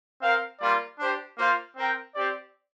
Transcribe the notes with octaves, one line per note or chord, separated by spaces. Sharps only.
C4 A#4 F5
G3 A#3 F4 D5
D4 G4 C5
A#3 F4 C5 F5
C4 A#4 G5
C4 G4 D5